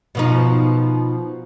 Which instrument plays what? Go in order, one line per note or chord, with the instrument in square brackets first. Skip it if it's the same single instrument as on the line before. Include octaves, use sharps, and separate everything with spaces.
[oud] B2 F3 D#4